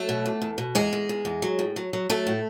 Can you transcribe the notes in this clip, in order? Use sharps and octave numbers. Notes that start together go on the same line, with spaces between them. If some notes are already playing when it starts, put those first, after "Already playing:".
Already playing: F#3 A3 A4
B2
E2
E2
B2
E2 G#3 G#4
E2
E2
E2
F#3
A2
F#3
F#3
F#3 A3 A4
A2